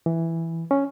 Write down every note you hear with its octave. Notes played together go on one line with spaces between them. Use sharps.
E3
C#4